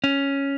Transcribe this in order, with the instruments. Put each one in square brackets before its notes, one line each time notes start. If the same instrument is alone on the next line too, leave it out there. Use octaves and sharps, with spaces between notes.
[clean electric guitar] C#4